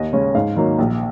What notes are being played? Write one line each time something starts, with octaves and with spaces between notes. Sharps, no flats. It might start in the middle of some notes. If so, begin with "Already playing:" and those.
Already playing: D#2 D#5
C#3 G#3 C#4
G#2 F5
D#3 F#3 A#3
A#1